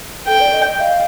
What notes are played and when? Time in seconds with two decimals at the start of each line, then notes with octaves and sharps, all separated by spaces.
0.27 A4 G5
0.40 D5
0.54 D#5
0.67 D#5
0.80 F5